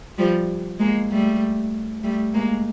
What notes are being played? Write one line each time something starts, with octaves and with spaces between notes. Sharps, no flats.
F3 G3
G#3 A#3
G3 A3
G3 A3
G#3 A#3